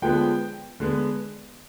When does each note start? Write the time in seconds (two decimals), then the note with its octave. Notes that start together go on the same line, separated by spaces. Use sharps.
0.02 D3 F3 G#3 B3 G5
0.80 D3 G#3 B3